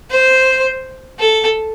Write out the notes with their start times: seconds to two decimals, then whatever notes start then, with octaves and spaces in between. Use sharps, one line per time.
0.11 C5
1.20 A4